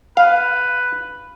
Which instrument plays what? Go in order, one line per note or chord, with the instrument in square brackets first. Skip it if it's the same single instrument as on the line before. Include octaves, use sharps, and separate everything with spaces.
[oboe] B4 [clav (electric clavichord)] F5